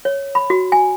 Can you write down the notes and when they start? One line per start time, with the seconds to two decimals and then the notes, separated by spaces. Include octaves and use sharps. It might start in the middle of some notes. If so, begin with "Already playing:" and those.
0.05 C#5
0.35 B5
0.50 F#4
0.72 G#5